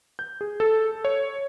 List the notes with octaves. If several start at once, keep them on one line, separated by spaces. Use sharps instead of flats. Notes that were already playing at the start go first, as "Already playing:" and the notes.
G6
G#4
A4
C#5